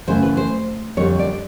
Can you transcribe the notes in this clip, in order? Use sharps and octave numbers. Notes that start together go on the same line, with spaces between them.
F#2 C#3 E3 A3 C5
B4
C5
F2 D3 G3 C#5
D5